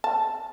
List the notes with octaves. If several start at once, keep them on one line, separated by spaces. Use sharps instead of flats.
A5